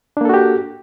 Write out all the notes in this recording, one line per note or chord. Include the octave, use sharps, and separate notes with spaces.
A#3 D4 F#4 G4 A4